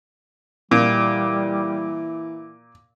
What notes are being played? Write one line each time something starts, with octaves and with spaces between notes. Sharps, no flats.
A#2 E3 G3